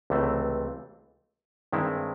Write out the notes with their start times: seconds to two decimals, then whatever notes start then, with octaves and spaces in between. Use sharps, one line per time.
0.10 C#2 C3 E3 A3 C4
1.72 G2 D#3 G#3 C4 E4